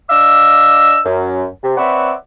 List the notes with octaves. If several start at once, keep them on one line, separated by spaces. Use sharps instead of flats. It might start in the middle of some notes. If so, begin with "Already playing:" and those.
D4 D#5 F5 D6 E6
F#2
C3
C4 B4 C#5 D5 E5 F#5